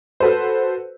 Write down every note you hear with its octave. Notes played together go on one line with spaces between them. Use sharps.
F#4 A4 B4 C5